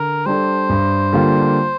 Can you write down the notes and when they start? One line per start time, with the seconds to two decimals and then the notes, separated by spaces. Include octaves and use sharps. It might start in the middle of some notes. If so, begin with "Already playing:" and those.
Already playing: D3 A#4
0.26 G3 D4 A4 C5
0.69 G2
1.13 D3 G3 A#3 F4